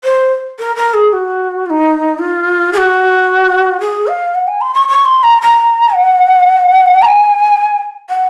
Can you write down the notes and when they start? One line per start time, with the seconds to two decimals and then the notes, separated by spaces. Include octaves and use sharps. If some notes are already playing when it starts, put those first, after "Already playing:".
0.04 C5
0.59 A#4
0.76 A#4
0.94 G#4
1.13 F#4
1.66 F4
1.70 D#4
2.19 F4
2.73 G#4
2.77 F#4
3.81 G#4
4.07 F5
4.35 F#5
4.48 G#5
4.61 C6
4.74 C#6
4.88 C#6
5.05 C6
5.23 A#5
5.42 A#5
5.94 F#5
7.02 A#5
7.06 G#5
8.09 F#5